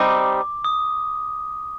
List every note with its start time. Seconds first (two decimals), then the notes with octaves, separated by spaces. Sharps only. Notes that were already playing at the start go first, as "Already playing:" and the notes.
Already playing: G3 C4 D#4 D6
0.65 D#6